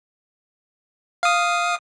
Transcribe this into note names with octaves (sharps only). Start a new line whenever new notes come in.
F5 D#6